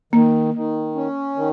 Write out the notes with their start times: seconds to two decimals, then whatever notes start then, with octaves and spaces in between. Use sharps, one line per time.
0.13 D#3 A#3
0.54 D#3
0.95 C#4
1.36 D#3